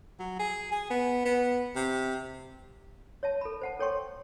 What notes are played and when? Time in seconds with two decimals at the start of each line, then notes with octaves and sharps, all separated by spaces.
0.19 F#3
0.39 G#4
0.72 G#4
0.90 B3
1.25 B3
1.76 C3
3.23 C#5 E5 A5
3.41 A4 B5
3.61 C5 F#5 A5
3.80 A4 C#5 G5 C6 C#6